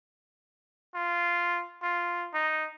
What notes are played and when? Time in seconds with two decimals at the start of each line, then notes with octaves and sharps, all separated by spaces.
0.95 F4
1.83 F4
2.34 D#4